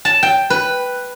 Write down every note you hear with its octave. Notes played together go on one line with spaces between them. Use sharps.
A5
G5
B4